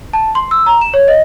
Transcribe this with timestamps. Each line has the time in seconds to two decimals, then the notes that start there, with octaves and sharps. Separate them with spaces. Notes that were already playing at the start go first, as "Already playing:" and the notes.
0.13 A5
0.35 C6
0.51 E6
0.66 A#5
0.81 E7
0.94 C#5
1.08 D#5